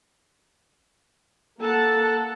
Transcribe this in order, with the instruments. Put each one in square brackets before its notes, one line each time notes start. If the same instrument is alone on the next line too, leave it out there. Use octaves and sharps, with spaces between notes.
[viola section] A#3 F#5 A5 [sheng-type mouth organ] A4